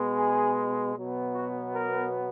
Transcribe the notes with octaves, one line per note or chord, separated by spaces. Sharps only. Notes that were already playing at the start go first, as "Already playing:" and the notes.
Already playing: B2 G#3 B3
G#4
B2 F#3 B3
F#4
A#4